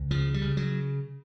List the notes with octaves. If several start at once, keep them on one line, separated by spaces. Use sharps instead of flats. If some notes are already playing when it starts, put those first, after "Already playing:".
Already playing: C#2
C#3 F3
G3
C#3
F#3